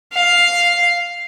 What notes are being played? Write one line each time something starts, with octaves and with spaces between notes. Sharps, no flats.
F5